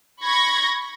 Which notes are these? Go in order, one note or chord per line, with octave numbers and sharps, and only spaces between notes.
B5 C#6 G#6 A#6